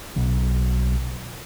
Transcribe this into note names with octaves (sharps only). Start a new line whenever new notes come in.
B1